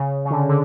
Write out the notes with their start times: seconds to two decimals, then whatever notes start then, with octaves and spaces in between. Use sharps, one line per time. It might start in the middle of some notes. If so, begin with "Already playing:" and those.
Already playing: C#3
0.25 C#3
0.30 D3
0.49 D3